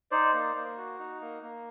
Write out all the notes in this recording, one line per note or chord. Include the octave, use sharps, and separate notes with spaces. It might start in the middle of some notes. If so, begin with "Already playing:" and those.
D#4 C5 D5
A#3
A#3
F#4
D#4
A#3
A#3